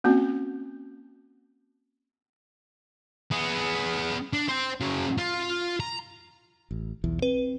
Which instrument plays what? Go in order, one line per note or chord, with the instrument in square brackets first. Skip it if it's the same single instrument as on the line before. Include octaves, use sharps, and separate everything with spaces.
[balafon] A#3 C4 C#4 F#4
[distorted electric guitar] B3 G#4
D4
C5 G5
C#3 F#3
F4
A#5
[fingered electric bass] A1
B1 E2 E3
[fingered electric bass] C4 [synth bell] B4